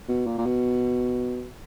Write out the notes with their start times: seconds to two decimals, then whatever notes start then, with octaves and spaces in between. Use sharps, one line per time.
0.09 B2
0.27 A#2
0.38 A#2
0.46 B2